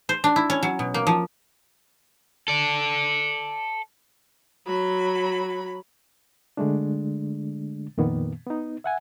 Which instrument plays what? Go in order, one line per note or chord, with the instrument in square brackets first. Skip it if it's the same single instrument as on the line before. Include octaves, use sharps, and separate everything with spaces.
[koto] C5
D4
E4
C#4
F#3
B2
A#3
F3
[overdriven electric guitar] A4 D5
[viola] F#3 B5
[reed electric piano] D3 G#3 A3 D4
F2 A#2 D#3 A#3 B3
B3 D#4
E5 F#5 G#5